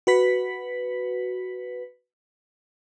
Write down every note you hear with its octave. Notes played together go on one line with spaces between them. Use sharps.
F#4 B4 B6